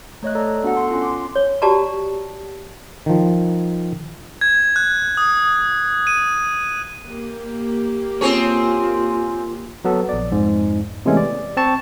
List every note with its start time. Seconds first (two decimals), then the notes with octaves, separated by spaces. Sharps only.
0.23 A3 C#5 D#5 F#6
0.35 A4 D5 A#5
0.64 B3 D4 F#4 A4 F#5
0.77 C6
0.89 C#4 F4 C6
1.02 C6 D6
1.36 C#5
1.62 F#4 G4 D5 A5 A#5
3.06 D#3 F3
4.41 G#6
4.76 F#6
5.17 D#6
6.07 D#7
7.06 A#3 G4
8.21 C4 F4 G#4 C#5
9.85 F#3 B3 A4
10.09 A#1 D5
10.31 F2 G#2
11.06 C3 E3 G#3 A3 B3 C#4
11.17 D5
11.57 C4 A5 C#6